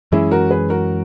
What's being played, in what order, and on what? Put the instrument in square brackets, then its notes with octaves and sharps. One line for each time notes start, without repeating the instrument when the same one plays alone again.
[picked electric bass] F#2 E3 G#3 C#4 [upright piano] E4 G#4
[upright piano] F#4 A#4
G#4 B4
F#4 A#4